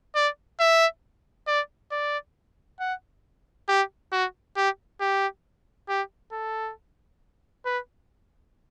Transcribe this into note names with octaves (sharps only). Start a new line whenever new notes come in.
D5
E5
D5
D5
F#5
G4
F#4
G4
G4
G4
A4
B4